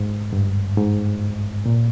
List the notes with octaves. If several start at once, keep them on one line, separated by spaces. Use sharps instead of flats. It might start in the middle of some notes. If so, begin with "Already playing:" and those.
Already playing: G#2
G2
G#2
A#2